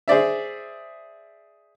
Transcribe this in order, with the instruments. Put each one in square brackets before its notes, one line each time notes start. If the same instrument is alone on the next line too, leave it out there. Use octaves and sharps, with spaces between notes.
[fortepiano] G#4 C5 D5 E5